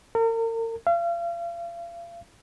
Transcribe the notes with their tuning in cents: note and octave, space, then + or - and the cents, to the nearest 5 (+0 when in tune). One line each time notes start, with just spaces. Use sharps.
A#4 -40
F5 -35